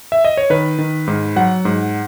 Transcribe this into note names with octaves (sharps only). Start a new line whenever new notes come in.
E5
D#5
C#5
D#3 B4
D#3
G#2
F#3 F#5
G#2